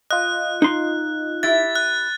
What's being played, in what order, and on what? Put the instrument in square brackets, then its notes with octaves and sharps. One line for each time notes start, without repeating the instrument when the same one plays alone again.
[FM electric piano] F4 D#5 [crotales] F#6
[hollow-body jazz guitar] D#4 C6
[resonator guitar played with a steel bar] E4 G4 E5 [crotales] A6
[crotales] F#6